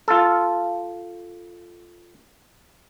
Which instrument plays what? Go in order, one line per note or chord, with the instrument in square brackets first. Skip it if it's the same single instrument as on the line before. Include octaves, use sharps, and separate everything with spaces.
[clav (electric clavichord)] F4 A4